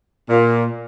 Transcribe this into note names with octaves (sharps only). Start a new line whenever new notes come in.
A#2